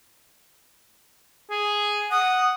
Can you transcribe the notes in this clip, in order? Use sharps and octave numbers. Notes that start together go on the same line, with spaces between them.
G#4
F#5 D#6